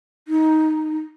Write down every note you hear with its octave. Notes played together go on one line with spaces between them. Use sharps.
D#4